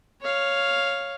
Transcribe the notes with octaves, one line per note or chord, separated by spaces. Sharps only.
C#5 F5